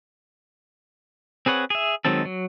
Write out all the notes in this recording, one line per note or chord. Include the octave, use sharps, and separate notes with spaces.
C4 G#4 B4 C#5 F#5
G#4 E5
D#3 F#3 G#3 C4 A4
F#3